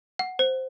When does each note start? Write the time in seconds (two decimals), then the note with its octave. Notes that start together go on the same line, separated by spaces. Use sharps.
0.19 F#5
0.39 C5